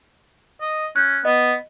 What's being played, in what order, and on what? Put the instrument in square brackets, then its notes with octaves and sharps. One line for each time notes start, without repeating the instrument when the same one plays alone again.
[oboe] D#5
[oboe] C#4 [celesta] F#6 G6
[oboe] B3 [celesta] D#5